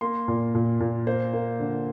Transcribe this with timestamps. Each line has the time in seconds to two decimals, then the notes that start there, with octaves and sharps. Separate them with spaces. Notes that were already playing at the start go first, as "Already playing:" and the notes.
0.01 A#3 C6
0.28 A#2
0.55 A#2
0.80 A#2
1.07 A#3 C5
1.33 A#3
1.60 D3